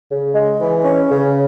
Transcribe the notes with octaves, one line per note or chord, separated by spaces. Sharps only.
C#3
G#3
E3
C#4
C#3